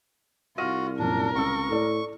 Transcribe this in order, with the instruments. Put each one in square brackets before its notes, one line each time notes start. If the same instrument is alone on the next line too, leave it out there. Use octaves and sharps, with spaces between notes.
[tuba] C2 [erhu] F4 [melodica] F#4 [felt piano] F6 A#6 D#7
[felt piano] F#2 A#2 [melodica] D4 [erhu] A#4
[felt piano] C#2 C4 E6 [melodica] C#6
[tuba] A2 [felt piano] A4 D5